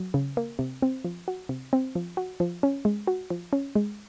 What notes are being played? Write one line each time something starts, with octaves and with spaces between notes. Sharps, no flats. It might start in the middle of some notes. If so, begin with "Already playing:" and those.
Already playing: F#3
C#3
A#3
C3
C4
F3
F#4
C3
C4
F3
F#4
F3
C#4
G#3
F#4
F3
C#4
G#3